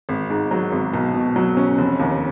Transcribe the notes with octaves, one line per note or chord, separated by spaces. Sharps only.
G#1
G#2
F#3
G#1
B1
B2
F#3
C#4
F1
D#2